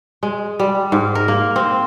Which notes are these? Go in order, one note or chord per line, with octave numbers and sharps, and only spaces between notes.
G#3
G3
G#2
A#4
A#3
C4